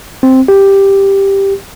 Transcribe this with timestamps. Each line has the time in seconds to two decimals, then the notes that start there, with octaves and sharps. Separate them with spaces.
0.23 C4
0.48 G4